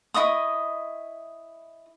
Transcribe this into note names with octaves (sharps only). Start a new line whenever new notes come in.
E4 D#5 C#6 D#6